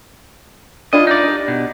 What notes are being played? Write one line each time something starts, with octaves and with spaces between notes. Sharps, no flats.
D4 E4 F4 D#5
D#4 D5
D4 G4
B2